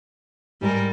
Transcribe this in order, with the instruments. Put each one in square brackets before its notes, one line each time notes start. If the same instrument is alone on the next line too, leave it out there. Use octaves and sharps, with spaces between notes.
[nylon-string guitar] G#2 [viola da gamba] G3 A#4